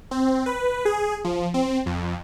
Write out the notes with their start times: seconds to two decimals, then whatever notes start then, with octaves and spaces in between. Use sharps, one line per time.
0.11 C4
0.46 B4
0.85 G#4
1.25 F3
1.54 C4
1.86 F2